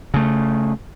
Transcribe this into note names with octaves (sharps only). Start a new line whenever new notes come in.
C#3 A3